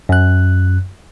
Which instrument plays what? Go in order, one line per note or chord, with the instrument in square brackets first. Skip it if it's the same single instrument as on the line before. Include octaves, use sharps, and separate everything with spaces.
[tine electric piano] F#2 F#6